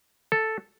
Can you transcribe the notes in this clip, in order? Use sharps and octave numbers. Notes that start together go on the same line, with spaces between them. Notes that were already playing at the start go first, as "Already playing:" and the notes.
A4